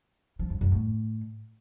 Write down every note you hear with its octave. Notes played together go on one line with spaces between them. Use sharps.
F3
F#2
F#2
A2